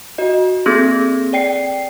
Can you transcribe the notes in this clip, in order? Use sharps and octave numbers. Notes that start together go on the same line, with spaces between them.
F#4 D#5
A#3 C4 G#4 A4 G#6 A#6
D5 G5 C7 C#7